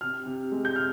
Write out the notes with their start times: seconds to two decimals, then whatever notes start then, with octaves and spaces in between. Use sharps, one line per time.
0.01 C3 F6
0.26 C3
0.52 G#3
0.65 G6
0.76 C3 F6